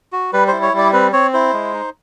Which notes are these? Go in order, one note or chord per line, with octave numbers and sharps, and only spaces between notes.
F#4
G3 B4
E4 C5
C#5
G3 D5
C4 B4
C4 C#5
E4 C5
G#3
D#4